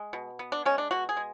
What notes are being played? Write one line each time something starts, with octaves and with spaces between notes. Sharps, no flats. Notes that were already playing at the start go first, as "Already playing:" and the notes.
Already playing: G#3
B2
B3
D4
G#3 C#4
D4
B2 F#4
G#4
G#3